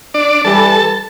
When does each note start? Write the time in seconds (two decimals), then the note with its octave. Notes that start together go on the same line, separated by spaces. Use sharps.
0.14 D4 D5
0.44 E3 G3 A4 A5